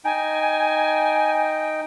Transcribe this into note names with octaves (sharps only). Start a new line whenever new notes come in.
D#4 G5 G#5